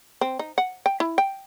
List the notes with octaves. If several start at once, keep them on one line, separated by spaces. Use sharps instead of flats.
C4
D#4
F#5
G5
E4
G5